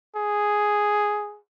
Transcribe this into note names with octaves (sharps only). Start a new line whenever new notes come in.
G#4